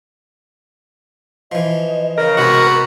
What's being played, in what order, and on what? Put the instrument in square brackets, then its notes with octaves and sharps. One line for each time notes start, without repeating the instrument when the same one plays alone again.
[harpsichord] E3 F3 [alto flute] D#5
[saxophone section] C#3 [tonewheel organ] A#4
[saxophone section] G#2 B3 F#4 [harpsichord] C3